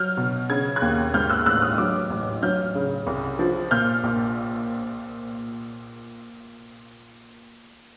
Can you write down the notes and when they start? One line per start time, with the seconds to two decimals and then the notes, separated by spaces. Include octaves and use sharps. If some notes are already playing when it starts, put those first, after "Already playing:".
Already playing: F#3 F6 G6
0.17 B2
0.49 C#3 G#6
0.76 F#6 G#6
0.82 D#2
1.14 G#2 F6 G6
1.30 E6 F#6
1.46 A1 E6 F#6
1.62 D#6 F6
1.78 F#3 D6 E6
2.10 A1
2.42 F#3 F6 G6
2.75 C#3
3.07 C2
3.39 F3
3.71 A#2 F6 G6
4.04 A#1